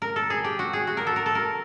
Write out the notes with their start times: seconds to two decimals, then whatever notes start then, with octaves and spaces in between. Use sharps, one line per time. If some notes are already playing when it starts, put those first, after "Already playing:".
0.02 A#4
0.16 A4
0.30 G#4
0.44 G4
0.59 F#4
0.73 G#4
0.87 F#4
0.97 A#4
1.07 A4
1.16 A#4
1.26 A4
1.35 A#4